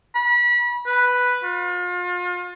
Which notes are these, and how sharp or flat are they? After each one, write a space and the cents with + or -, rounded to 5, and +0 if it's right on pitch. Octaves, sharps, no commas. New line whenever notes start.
B5 -30
B4 +0
F4 +35